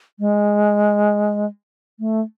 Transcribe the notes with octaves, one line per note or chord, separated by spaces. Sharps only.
G#3
A3